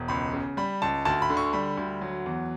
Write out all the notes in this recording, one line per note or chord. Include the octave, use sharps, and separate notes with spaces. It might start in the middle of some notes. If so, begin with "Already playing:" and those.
Already playing: E1
C#2 B5
C#3
G3 B5
C#2 A5
D2 A5
B5
D3
C#6
G3 B5
D2
F#3
E2